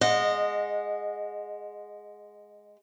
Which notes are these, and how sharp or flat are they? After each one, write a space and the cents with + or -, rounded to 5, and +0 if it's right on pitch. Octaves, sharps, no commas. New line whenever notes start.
G#3 +0 D#5 -15 F#5 -30